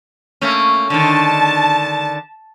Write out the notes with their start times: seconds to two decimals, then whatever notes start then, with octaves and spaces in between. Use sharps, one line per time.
0.41 A3 A#3 C#4
0.90 D3 D#3 A5